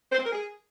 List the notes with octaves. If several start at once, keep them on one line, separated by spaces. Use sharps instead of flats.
C5
C4
A#4
G#4